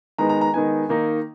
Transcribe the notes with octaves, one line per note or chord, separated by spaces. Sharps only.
D#3 G#3 B3 D#4 A#5
A#5
A#5
D#3 G#3 B3 D#4 G#5
D#3 A#3 D#4